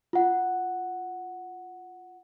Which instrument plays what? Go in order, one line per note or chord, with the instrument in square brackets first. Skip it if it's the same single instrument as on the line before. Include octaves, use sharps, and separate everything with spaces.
[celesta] F4 F#5